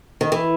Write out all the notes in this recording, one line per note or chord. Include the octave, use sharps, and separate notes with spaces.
D#3
E3